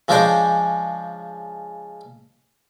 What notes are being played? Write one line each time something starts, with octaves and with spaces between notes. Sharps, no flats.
C#3 F3 G#3 D4 C5 G5